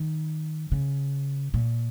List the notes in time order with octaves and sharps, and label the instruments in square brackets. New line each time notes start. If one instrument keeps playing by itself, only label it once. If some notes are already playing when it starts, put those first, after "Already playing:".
Already playing: [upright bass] D#3
C#3
A#2